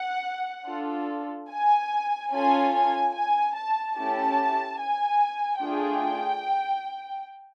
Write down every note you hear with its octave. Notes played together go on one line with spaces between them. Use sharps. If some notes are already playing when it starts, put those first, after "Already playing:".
Already playing: F#5
D4 F4 A4
G#5
C#4 F4 A4 G#5
G#5
G#5
A5
A3 C#4 E4 G4 A5
G#5
A3 D4 F4 G#4 G5